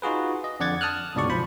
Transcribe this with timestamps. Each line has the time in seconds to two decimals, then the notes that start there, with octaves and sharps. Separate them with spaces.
0.02 D#4 F4 F#4 G#4 B4
0.44 D#5
0.60 F2 D3 D5 F#5 G#6 A6
0.81 A5 D#6 F6 F#6
1.15 G1 C#2 B2 D4 D5 C#6
1.29 B1 F3 C5 B5